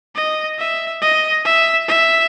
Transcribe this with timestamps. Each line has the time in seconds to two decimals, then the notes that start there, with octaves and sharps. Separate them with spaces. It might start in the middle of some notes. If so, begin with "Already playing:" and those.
0.15 D#5
0.58 E5
1.01 D#5
1.45 E5
1.88 E5